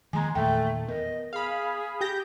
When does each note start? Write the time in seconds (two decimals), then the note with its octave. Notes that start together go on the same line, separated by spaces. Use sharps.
0.13 D#3 F3 G#3 A#3 G#5 A#5
0.35 E2 A#2 D#3 A3 G5
0.88 B3 A#4 D#5
1.33 G#4 F5 B5
2.01 G4 G6 A#6